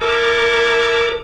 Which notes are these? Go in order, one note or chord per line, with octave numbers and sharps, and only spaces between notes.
E4 A4 A#4 D6